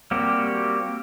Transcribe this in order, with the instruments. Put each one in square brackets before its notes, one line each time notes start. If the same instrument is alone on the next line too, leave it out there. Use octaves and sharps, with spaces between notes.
[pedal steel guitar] G3 A#3 C4 F#4 G4